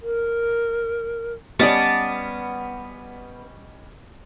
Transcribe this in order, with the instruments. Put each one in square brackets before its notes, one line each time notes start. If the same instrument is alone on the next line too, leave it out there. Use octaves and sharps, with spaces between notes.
[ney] A#4
[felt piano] G3 C#4 D#5 [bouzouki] B3 [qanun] D5 A5